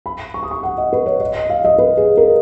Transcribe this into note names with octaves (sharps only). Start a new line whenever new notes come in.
B5
C#6
D#6
C#6
F#5
D#5
B4
C#5
D#5
D#5
F5
D#5
B4
G#4
A#4